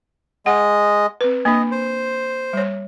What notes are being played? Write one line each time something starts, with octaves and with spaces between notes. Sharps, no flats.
G#3 D#5 F#5
C4 B4
A#3 D4 D#5
C5
G3 C#5